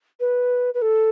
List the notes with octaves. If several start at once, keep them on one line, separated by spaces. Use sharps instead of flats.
B4
B4
A4